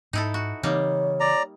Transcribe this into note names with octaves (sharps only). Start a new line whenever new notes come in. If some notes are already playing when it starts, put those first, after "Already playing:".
G#2 D#4 E4 A4
F#4
C#3 E3 G3 A#3 C4 D#4 C#5
D5 A#5